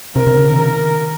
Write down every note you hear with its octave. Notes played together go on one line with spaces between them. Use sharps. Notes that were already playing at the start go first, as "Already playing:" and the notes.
C3 A#4
C3
C#3
D#3
A#4